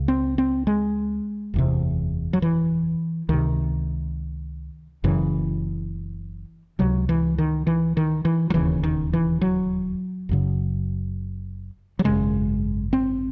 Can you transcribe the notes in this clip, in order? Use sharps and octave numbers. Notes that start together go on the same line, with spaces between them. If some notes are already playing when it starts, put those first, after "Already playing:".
Already playing: C#2 C#3
C4
C4
G#3
F#1 E2 C3
F#3
E3
C#2 C3 D#3
F#1 F#2 C#3 E3
C#2 C3 F#3
E3
D#3
E3
D#3
E3
F#3
E1 D#2 C#3 E3
D#3
E3
F#3
F#1 F#2 C#3
F#3
G#1 F#2 C#3 G#3
C4